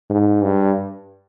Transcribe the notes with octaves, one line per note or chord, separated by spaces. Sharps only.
G#2
G2